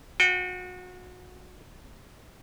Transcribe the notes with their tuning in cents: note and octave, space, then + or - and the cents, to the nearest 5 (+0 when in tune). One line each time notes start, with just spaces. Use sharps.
F#4 -30 G5 +0